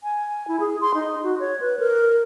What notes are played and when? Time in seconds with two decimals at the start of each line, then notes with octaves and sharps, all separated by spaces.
0.03 G#5
0.48 E4
0.60 G#4
0.81 C6
0.94 D#4
1.23 F#4
1.40 C#5
1.61 B4
1.79 A#4